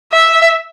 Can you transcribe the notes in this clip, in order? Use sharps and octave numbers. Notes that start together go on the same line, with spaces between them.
E5